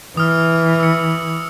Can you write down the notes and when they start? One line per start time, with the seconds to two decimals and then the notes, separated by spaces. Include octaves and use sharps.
0.17 E3 D#6 F6
0.80 E6 C#7